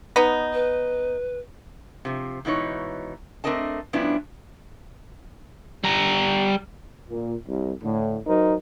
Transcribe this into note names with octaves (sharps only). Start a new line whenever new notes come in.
B3 D#4
B4
C3 F3
G#2 B2 E3 D#4 C#5
A3 C4 D4 A#4 D#5 A5
G2 F3 B3 C#4 D4 E4
G3 A#5
A#2
C2
A2 D3
F#3 D#4 A#4 C5